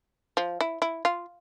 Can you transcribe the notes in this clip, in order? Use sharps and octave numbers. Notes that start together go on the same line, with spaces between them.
F3
E4
E4
F4